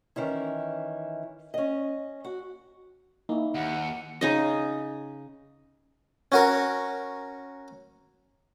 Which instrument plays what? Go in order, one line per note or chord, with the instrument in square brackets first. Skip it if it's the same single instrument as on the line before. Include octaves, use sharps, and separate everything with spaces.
[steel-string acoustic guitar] D#3 E3 C#4 E4
C#4 D#5
F#4
[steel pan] A#3 E4 [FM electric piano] D#4
[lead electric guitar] D#2 [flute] F#5
[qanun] C#3 D#4 D#5
[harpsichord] C#4 F#4 A#4